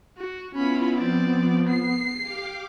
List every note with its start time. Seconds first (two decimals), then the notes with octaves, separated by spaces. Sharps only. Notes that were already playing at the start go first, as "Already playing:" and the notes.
0.17 F#4
0.54 B3 C#4 E4 F4 B5
0.96 F3 C4 D5
1.69 C7
2.20 G4 F5 D6